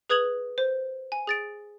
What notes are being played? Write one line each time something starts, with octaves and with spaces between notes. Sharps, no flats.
G#4 B4 D#6 G#6 F7 F#7
C5
G#5
G#4 A6 D7